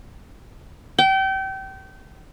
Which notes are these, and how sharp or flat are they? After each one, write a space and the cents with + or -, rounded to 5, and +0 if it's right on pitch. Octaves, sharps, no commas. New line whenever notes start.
G5 -30